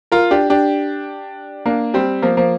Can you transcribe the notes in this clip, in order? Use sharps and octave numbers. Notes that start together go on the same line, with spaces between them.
F4 A#4
D4 G4
D4 G4
A#3 D4
G3 C4
F3 A#3
F3 A#3